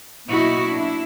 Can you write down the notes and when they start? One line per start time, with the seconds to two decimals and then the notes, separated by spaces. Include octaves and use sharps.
0.29 B2 F#3 A#3 D#4 E4 F#4
0.74 D4 E4